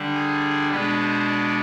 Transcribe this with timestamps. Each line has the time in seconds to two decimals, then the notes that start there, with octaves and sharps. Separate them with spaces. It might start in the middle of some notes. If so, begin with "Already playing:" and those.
Already playing: D3 G3 D4
0.14 G#4
0.71 B2 G#3 B3 D4 B4
1.00 C5
1.29 D5